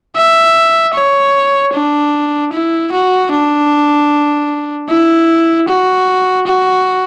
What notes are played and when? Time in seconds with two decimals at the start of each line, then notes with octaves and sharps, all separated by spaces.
0.16 E5
0.94 C#5
1.73 D4
2.53 E4
2.92 F#4
3.31 D4
4.89 E4
5.68 F#4
6.47 F#4